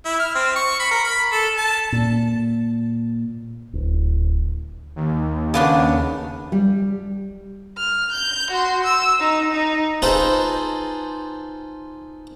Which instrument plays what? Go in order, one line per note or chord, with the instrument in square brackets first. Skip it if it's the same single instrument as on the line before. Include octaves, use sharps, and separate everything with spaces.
[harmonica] E4
F6
C4
C#6
B5
A#4
B5
A4
A5
[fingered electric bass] A#2
D1
[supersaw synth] D#2
[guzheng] C#3 B3 D4
[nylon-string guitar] G3
[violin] F6
G6
F#4 C6
E6
D#4
D#4
[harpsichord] D#4 F4 G#4 A4 B4 C5